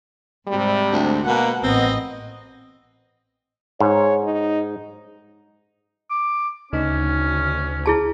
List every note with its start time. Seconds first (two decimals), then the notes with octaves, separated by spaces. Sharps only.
0.47 G#2 C3 G3
0.91 D2
1.27 B2 A#3 F#5
1.63 A1 B3 C4 D#5
3.80 G#2 C#5
4.23 D#4
6.10 D6
6.73 D2 C#3 C#4 D#4
7.86 E4 G#4 A5